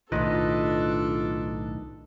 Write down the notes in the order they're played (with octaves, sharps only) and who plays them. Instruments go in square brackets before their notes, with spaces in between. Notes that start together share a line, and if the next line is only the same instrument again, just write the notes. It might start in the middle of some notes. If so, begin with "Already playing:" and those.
[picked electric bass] B1 A2 D#3 [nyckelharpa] D4 A4 [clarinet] F4 [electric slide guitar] B4 D#5